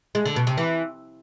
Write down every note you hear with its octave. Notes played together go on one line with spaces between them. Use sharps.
G#3
D3
B2
C3
E3